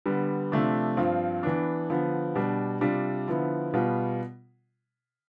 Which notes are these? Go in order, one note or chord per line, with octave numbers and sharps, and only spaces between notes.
D3 G3 B3
C3 F3 A3 D4
G2 F3 C4 F4
E3 B3 D4
D3 F3 B3
B2 G3 D4
C3 G3 D4 F4
D3 F3 B3 E4
B2 G3 B3 F4